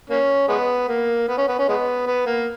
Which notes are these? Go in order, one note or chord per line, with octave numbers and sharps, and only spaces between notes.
A#3 C#4
G#3 B3
A#3
B3
C#4
B3
C#4
G#3 B3
B3
A#3